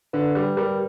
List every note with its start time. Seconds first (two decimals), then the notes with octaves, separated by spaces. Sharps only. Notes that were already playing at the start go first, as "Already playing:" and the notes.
0.13 D3 B4
0.35 G3
0.57 G3 A#4